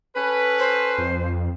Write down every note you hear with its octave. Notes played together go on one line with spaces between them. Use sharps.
C#4 A4 B4
C5
F2